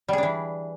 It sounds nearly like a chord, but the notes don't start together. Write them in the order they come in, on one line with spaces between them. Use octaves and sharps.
G3 G#4 D4 E3